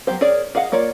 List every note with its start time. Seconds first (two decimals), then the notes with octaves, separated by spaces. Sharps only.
0.07 F#3 B3 G4 C5
0.21 G#4 A#4 C#5 D5
0.55 G#4 D#5 F5 F#5
0.72 A#3 F4 C#5 D5